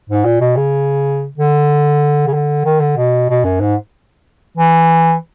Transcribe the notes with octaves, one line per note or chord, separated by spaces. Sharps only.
G#2
A#2
B2
C#3
D3
C#3
D3
D#3
D3
B2
B2
F#2
G#2
E3